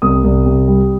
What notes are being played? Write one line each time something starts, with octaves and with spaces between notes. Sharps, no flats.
C2 D#6
C2
C3
G3